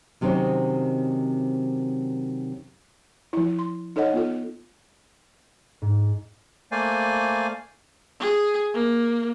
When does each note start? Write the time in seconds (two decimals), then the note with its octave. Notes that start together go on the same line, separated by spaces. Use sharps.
0.21 F#2 C3 D#3 C4 D#4 C#5
3.33 F3 E4
3.59 C6
3.96 D#4 A4 C#5 D#5 F#5
4.13 B3 F4 A4
5.82 G#2
6.72 A3 A#3 C5 D5 F5 G#5
8.20 G#4
8.73 A#3